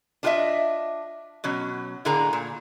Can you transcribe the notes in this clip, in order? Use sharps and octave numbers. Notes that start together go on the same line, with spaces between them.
D4 F4 F#4 A#4 D#5 E5
B2 F#3 C#4
A2 D3 A#3 G#4 A#5
A#2